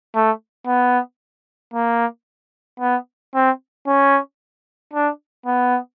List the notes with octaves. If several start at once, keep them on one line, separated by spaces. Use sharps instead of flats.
A3
B3
A#3
B3
C4
C#4
D4
B3